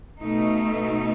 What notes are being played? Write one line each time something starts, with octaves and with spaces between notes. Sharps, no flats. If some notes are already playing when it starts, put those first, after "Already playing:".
B2 A3 D#4